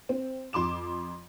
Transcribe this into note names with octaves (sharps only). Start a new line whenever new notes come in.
C4
F2 C6 D6 E7